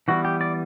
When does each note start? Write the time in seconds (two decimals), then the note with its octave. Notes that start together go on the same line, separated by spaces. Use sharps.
0.08 E3 G3 B3 F#4
0.25 G4
0.41 D5